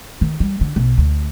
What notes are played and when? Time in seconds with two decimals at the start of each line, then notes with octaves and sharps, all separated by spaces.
0.21 D#3
0.40 G3
0.61 D3
0.76 B1
0.98 D2